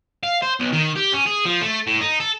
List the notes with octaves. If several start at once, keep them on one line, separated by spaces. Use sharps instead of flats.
F5
C5
B1
D#3
G4
C#4
G#4
F3
A3
A2
D#4
A4